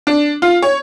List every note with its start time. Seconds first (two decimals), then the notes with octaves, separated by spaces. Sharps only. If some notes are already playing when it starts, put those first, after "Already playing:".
0.07 D4
0.42 F4
0.62 C#5